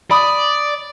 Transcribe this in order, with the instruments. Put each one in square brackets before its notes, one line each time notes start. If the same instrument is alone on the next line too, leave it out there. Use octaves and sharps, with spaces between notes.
[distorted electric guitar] D5 [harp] B5 D#6